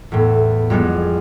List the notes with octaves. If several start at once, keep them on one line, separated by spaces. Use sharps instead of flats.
E2 A2 B3
F2 G3 G#3 B3